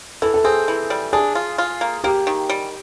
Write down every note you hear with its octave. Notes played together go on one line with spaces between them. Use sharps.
E3 A4
A4
C4 G#4
E3
G3
D4 G#4
F4
F4
A#3
A#3 G4
D#3
G3